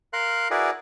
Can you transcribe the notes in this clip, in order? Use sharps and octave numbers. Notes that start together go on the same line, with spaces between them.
A#4 F5 C6 F#6
E4 F#4 G#4 A#4 B4 D5